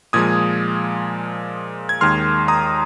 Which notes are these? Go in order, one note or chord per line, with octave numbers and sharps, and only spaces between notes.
A#2 F3 G#3 D#6 G#6
G#6
D#2 D#3 G#3 C6 F6
A#5 D#6